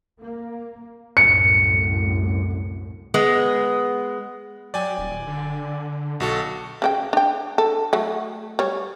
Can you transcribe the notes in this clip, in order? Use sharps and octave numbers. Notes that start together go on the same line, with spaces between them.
A#3
C2 F#2 A2 C#7
G#3 B3
F#3 D5 G5 G#5
D#1
D3
B1 F#4 A4
C#3 D4 G5
D4 G5
A4
F#3 A3
G3 C#5